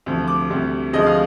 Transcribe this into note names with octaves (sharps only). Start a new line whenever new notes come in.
D2 C3 F3
D6
D2 C3 G3
D2 C3 F3 G#3 D#5
F5